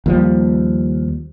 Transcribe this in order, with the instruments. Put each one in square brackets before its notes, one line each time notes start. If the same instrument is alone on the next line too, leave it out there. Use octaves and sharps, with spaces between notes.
[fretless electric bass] D#2 F3 G3